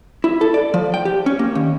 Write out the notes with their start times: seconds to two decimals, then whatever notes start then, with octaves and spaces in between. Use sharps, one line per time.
0.24 E4
0.41 A4
0.54 D5
0.74 F3
0.94 G5
1.05 G4
1.26 C#4
1.39 A#3
1.55 D#2